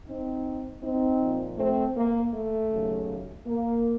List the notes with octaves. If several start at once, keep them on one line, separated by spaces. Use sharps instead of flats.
C4 D#4
C4 D#4
A#2 F3
A3 C4
A#3
A3
D#2 C#3 F#3
A#3